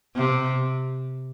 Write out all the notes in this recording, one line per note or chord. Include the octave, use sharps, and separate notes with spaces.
C3